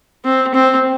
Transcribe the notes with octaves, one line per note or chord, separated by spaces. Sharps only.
C4
C4